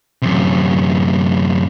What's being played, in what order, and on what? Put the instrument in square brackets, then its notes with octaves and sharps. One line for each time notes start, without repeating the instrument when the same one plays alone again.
[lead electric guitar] F#2 C3